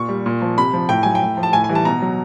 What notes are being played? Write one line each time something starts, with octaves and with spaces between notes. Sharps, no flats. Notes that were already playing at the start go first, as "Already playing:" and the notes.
Already playing: A#2 C#6
G3
A#2
F3
C3 B5
F3
A2 G5
F#3 G#5
G5
A2
F3
A5
A2 G#5
G#5
E3 G3
A5
B2 A#5
F#3